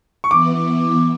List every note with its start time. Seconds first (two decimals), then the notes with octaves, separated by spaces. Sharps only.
0.24 C#6
0.31 E3 B3 E4 D6